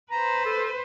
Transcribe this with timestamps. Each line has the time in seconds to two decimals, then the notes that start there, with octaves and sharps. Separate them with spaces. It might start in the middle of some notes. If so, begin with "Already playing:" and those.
0.11 B4 C5 A#5
0.46 A4